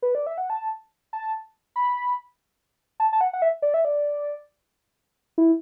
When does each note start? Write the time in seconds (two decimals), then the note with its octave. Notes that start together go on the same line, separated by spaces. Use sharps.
0.02 B4
0.15 D5
0.27 E5
0.38 F#5
0.50 A5
1.13 A5
1.76 B5
3.00 A5
3.13 A5
3.21 F#5
3.33 F#5
3.42 E5
3.62 D5
3.74 E5
3.85 D5
5.38 E4